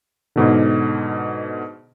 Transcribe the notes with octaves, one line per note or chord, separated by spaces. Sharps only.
G#2 B2 D3